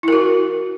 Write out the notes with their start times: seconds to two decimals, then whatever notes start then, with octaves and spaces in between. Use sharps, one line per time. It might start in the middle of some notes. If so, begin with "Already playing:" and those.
0.03 E4
0.08 A#4
0.13 F#4